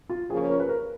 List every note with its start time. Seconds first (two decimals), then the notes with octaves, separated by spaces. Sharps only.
0.10 F4
0.29 C#3 F3 A#3 C#4 G#4
0.50 A#4
0.60 B4
0.69 A#4